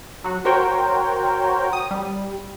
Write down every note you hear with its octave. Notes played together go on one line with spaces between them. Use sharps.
F#3 F#4
F#4 A#4 C5 C#5 G5
D#6
G3